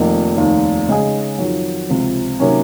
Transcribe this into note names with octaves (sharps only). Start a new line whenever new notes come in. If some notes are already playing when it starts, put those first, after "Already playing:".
Already playing: F1 F2 D#3 A#3 D#4
F1 D#2 D#3
C#3 G#3 D#4 G#4
F2 D#3 F#3
C#2 C3 F3 C4
C3 D#3 F#3 A#3 C#4